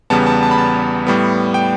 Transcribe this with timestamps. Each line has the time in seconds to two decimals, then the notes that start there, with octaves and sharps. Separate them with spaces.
0.10 E2 C#3 G3 B3 A5
0.26 A5
0.43 A5
0.51 B5
0.58 A5
1.07 A2 G3 B3
1.54 G5